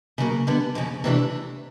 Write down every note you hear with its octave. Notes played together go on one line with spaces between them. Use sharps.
C#3 F#3 A#3
D3 G3 B3
F2 C#3 F3 A#3
C3 E3 A3 D4